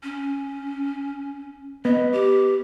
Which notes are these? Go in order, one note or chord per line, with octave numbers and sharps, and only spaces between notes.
C#4
B3 D#5
G4